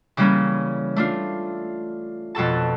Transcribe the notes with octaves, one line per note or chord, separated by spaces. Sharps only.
C#3 E3 G3 A#3 C#4
A3 D4 F4
F2 B2 A4 A5